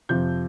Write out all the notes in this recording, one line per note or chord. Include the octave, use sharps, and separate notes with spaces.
F2 C3 F3 G6